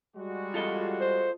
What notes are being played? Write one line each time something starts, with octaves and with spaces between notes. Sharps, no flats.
G3 G#3 F#4
F4 A4 D#5
C5